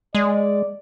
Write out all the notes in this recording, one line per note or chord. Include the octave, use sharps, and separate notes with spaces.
G#3 D5